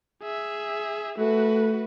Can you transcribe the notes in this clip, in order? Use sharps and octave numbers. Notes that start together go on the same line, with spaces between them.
G#4 E5
A3 F#4 B4